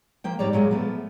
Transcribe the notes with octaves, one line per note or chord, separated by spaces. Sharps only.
F3 A#3 G5
G#2 G3 C#5 D5 A#5
A#2 F#3 G#3 A#3
F3 A3 B3